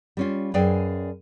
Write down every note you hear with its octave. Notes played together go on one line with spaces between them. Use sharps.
G3 C#4 F4
F#2 G#4 B4 D5 F5 G5